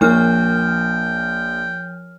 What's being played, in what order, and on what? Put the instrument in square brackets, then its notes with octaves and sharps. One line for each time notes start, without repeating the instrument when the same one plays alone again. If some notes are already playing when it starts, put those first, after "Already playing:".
[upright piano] A#1 [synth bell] F3 C#5 F6 [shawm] G5